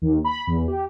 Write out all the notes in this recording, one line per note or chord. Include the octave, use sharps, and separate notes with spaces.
D#2
B5
E2
G4